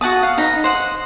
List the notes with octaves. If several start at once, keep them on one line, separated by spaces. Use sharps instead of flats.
F#4 F#5 A5 D#6
F5
D#4 B4 A#5
C5 F#5 D#6